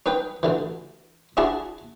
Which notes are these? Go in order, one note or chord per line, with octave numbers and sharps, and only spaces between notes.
C#4 D#4 B4 G5
A1 D3 E3
C#4 D4 E4 F#4 G#4 A5